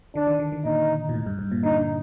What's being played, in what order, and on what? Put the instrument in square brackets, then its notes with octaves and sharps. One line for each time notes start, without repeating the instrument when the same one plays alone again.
[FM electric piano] D3 [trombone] D4
[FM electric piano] D#3
D3
D3
[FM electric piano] A#2 [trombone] D#4
[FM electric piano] A#2
A2
G2
G2
A#2
[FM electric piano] D3 [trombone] D#4